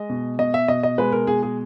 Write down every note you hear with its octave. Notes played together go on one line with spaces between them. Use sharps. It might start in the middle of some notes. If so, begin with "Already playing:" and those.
Already playing: G#3 D#5
B2
B2 D#5
E5
B2 D#5
D#5
G#3 B4
A#4
B2 G#4
G#4